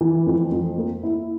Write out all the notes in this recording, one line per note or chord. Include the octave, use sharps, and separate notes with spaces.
E3
F2
F2
A#3
E4